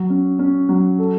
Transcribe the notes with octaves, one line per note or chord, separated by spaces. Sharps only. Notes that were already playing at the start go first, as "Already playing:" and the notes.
Already playing: F#3
C#4
C#4
F#3
A4